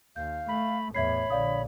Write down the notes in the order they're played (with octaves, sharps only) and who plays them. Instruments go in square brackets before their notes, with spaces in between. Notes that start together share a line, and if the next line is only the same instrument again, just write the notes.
[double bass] D#2 [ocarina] F5 [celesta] G6
[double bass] A3 [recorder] B5
[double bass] E2 A2 [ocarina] C#5 [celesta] E5 G#6 C7 [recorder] B5
[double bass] A#1 D3 [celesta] D5 F5 D#6